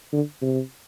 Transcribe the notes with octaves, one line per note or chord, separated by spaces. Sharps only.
D3
C3